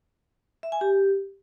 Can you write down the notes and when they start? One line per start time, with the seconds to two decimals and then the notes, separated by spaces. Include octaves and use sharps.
0.63 E5
0.72 G#5
0.81 G4